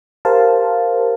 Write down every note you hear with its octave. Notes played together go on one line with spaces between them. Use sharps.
G4 A#4 C5 F5 A5